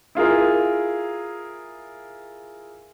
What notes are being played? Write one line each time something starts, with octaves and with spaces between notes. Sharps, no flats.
E4 F4 G#4 A#4